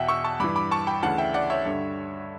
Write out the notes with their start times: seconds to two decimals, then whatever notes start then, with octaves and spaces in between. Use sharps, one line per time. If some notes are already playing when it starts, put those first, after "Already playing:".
Already playing: E2 B2 E5 F#5 G5
0.08 C#6 E6
0.24 A5 C#6
0.40 G2 E3 B5 D6
0.56 B5 D6
0.71 A5 C#6
0.87 G5 B5
1.03 D2 C#3 E3 F#5 A5
1.18 E5 G5
1.34 D5 F#5
1.50 C#5 E5
1.66 G2 D3